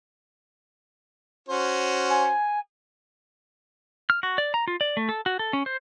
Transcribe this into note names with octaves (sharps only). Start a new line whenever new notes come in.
C#4 F#4 C5
G#5
F6
F#4
D5
A#5
F4
D5
A3
A4
F#4
A4
C#4
C5